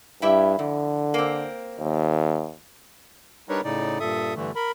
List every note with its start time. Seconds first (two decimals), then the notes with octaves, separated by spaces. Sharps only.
0.22 G2 E4 G4 E5
0.59 F2 D3
1.14 A#3 C4
1.80 D#2
3.49 G3 D4 D#4 A#4 B4 C#5
3.64 A2 C#3 D#4 D5
4.00 G2 A#2 A4 E5 D#6
4.36 G2 D3 E3 A3
4.56 A#4 B5